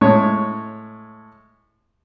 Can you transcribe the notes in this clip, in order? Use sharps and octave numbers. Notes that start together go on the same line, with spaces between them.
A2 G#3 C#5